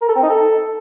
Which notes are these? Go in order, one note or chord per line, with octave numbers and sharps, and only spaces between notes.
A#4
A4
C4
D#4
A4